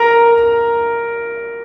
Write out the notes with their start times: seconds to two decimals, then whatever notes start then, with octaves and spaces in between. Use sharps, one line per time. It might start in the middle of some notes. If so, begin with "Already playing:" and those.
Already playing: A#4 A#5